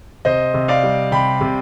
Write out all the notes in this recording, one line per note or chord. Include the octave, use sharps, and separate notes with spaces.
C3 C5 D#5
C3
D5 F5
G3
C3 G5 B5
C3